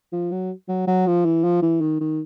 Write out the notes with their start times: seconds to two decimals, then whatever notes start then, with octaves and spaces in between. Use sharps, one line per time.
0.13 F3
0.31 F#3
0.68 F#3
0.87 F#3
1.07 F3
1.25 E3
1.44 F3
1.62 E3
1.81 D#3
2.01 D#3